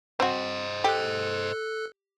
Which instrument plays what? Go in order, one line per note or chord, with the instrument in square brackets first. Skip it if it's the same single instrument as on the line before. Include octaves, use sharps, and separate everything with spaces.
[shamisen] C4 F#4 [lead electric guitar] C5 D#5
[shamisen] G4 [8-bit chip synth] A4 F#6